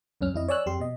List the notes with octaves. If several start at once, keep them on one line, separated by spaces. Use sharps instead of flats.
C#2 F#2 C#4 F6
F2 E4 D#5
C#5 D5 G#5 E6 F#6
F2 G4 C6
B2 D#5